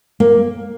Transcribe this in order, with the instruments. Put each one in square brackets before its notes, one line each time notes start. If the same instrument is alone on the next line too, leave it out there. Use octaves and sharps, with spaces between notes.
[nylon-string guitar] A#3